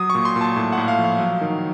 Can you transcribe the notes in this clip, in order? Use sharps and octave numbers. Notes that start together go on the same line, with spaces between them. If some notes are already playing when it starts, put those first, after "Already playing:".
Already playing: F#3 D#6
C#6
A#2
C6
A#2
A5
A2 A5
F#5
A2
F5
F3
F5
F#3
D#3